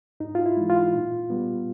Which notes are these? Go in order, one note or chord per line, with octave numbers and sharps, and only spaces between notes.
G#2 D#4
F4
E4
E3 G#3
F4
A#2
G3 B3